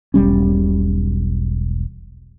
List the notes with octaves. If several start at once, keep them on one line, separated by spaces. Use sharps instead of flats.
E1 B1 G3 C#4